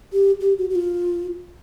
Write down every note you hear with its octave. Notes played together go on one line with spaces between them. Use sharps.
G4
G4
F#4
F#4
F4